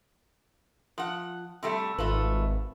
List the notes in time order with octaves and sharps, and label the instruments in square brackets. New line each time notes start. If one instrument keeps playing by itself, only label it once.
[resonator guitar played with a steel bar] F3 F#5
C3 G3 A3
[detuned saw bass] G#1 [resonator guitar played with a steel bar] A3 F4 B4